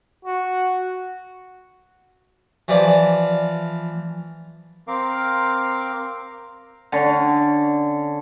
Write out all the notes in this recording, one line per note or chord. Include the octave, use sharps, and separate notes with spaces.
F#4
E3 F3 D5
C4 A#4 F5 D6
D3 C#4